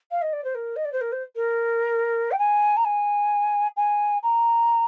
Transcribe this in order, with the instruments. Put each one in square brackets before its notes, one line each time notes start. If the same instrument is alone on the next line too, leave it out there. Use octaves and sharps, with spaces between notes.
[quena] F5
D#5
D5
C5
A#4
D#5
D5
C5
A#4
C5
A#4
G5
G#5
A#5
G#5
G#5
A#5